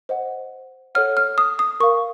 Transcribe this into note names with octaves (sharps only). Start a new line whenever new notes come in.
C5 D#5 F#5
A4 C#5 F#5 F6
F6
D#6
D#6
A#4 F5 C#6